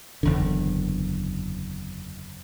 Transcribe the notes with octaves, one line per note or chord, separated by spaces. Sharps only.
F#1 E2 D3